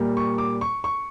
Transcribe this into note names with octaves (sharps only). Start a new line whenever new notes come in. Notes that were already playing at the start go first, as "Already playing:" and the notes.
Already playing: A#2 G3 A#3
C#6
D6
C#6
C#6